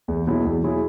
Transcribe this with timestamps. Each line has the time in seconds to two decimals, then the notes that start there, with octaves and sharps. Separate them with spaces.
0.08 E2
0.27 B2 F#3 E4 G#4
0.44 E2
0.63 B2 F#3 E4 G#4